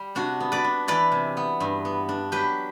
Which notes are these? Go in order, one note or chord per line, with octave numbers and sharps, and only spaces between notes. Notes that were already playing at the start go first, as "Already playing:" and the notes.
Already playing: G3
C3 D4 F#4
B3
B4 D5
D4
E3 B4 D5
C3
B3
G2
B3
D4
F#3 G4 B4